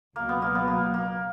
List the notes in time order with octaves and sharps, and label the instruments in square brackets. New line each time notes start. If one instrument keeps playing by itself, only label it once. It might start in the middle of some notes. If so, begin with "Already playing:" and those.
[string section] C#2 B2 F#3 [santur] A#3
[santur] B3
A#3
B3
A#3
A#3